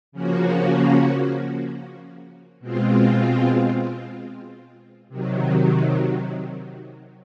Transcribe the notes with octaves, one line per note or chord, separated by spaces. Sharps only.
C#3 F3 A#3 C#4 F#4
B2 G#3 C4 F4
C3 D#3 F#3